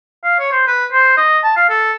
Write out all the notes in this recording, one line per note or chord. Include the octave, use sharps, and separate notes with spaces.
F5
C#5
C5
B4
C5
D#5
A5
F5
A4